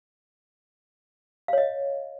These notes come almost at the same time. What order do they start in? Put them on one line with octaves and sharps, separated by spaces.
F5 C#5 D#5